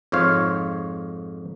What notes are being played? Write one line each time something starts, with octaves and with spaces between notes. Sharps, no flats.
F2 G#2 C5 C#5 F5